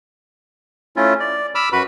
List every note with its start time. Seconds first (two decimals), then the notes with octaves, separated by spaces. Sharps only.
0.96 A3 C#4 E4 F4
1.20 D5
1.55 B5 D6 E6 F6
1.72 F#2 F#4 B4 B5